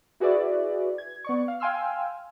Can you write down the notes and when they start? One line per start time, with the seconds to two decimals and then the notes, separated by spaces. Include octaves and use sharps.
0.20 E4 F#4 G#4 B4 D5 E5
0.98 G#6
1.24 B3 D5 C#6
1.48 F5
1.60 F5 G5 G#5 C6 E6 F6